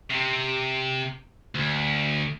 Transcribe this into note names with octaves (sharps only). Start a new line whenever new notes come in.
C3
D2